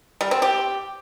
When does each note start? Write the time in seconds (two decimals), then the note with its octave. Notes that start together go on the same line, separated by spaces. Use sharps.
0.21 G3
0.31 C4
0.42 G4